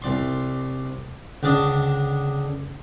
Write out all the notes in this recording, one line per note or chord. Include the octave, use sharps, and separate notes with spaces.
C2 D5 C6
C#2 D3 D4 D5 D#5